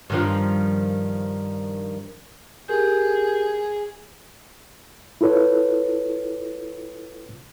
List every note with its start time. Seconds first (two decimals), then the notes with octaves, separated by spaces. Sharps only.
0.10 G2 D#3 F3
2.68 G4 G#4 A#4 G6
5.21 E4 F4 A4 B4 C#5